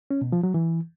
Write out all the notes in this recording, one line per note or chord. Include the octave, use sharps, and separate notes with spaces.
C#4
B2
F3
F#3
E3